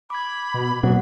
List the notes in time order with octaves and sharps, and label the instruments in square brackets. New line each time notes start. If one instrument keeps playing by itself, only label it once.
[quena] B5 [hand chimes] D6 G#6
[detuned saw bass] B2
[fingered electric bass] B2 [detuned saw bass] F#3 [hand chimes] A#3 C4 F#5